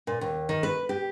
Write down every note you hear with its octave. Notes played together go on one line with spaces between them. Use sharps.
A#2
D#2
D#3
B4
G4